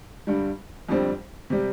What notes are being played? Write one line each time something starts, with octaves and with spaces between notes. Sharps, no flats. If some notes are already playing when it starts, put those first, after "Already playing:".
G2 D3 G3
F2 D3 G3 C4
C3 G3